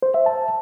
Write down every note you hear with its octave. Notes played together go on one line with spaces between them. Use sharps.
C5
E5
A5